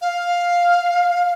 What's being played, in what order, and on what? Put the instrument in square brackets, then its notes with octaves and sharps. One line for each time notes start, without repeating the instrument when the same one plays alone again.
[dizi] F5